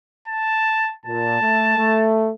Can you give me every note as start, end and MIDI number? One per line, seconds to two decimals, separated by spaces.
0.28 0.92 81
1.06 1.36 46
1.06 2.09 81
1.40 1.76 57
1.77 2.30 57